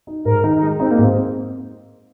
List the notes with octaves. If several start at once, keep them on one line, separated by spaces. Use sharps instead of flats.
D#4
G#2 A#4
D#3 D#4
D#4
G#3
C4 D#4
A#3
G#2
C4